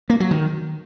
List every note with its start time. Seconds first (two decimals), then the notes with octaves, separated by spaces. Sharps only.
0.10 A#3
0.20 F#3
0.31 D#3